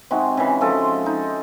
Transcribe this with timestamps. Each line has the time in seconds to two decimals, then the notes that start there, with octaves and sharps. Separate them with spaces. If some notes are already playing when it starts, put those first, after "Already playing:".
0.11 C3 G#3 D#4 F#4
0.37 C#3 E3
0.61 F3 G#3 F4 A4
1.06 D#4